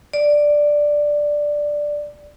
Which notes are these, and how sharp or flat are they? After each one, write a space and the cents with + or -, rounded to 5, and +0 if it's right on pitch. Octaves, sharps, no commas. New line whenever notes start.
D5 +5